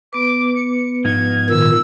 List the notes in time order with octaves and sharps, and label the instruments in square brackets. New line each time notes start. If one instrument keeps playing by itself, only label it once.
[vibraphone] B3 B4 [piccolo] D6
[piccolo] C#7
[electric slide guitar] G#2 F3 D#4 [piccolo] G#6
[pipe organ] A#2 D#3 [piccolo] E6